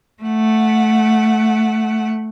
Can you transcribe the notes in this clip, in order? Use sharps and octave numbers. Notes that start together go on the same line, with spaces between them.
A3 F#5